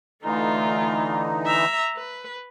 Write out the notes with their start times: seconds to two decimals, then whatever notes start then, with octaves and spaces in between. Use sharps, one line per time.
0.23 D3 E3 A3 D#4 F4
1.46 E5 A#5
1.96 B4